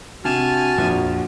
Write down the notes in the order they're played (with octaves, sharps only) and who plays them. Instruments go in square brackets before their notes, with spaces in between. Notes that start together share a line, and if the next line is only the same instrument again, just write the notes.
[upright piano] C3 E7 [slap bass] D4 [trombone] F#4 [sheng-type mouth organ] G#5 A5 F6
[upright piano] A#1 F3 [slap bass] F2